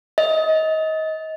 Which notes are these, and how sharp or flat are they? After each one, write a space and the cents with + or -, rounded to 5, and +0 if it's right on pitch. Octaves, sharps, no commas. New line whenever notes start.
D#5 +25